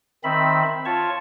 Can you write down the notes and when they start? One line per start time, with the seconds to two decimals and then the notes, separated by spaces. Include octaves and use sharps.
0.24 D#3 C4 E5 B5
0.86 F4 C#5 A5 C#6